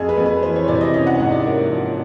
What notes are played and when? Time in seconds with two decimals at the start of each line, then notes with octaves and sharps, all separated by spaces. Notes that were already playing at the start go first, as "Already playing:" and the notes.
Already playing: F2 G#4
0.09 B4
0.18 F2
0.26 B4
0.43 E3 C5
0.56 C#5
0.68 C3 D5
0.81 D#5
0.94 C#4 D#5
1.07 F#5
1.20 G#2 F#5
1.32 D5
1.45 A#3 C#5
1.70 F3